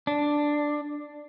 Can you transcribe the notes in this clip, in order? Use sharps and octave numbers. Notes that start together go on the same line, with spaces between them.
D4